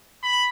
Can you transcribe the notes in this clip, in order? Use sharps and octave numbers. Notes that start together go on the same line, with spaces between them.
B5